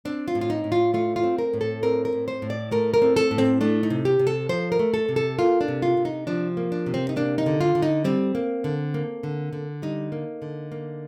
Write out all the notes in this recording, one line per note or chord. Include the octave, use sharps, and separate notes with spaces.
C4 D4
F4
A2
F4
D#4
A2
F4
A3 F4
F4
C4
A#4
A2
A4
C4 A#4
A#4
A2
C5
A2
D5
A3 A#4
A#4
C4
A4
A2
C4
A3 D4
D#4
C3
G4
C3
A4
F3 C5
A#4
A3
A4
C3
A4
A#3 F4
D4
C3
F4
C3
D#4
F3 D4
A#3
D4
C3
C4
D#4
A#3 D4
D#4
D3
F4
D3
D#4
G3 C4
A#3
D3
A#3
D3
D3
G3 D#4
A#3
D3
A#3